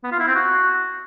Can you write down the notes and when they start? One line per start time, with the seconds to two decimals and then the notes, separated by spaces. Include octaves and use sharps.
0.04 B3
0.12 F4
0.19 E4
0.27 C4
0.35 F#4